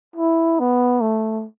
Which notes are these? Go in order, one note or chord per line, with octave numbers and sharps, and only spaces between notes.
E4
B3
A3